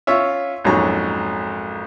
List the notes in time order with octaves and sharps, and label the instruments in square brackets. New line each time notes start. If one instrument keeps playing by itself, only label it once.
[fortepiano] C#4 F4 C#5 E5
A#1 F2 G#2 F#3 C#4 A#5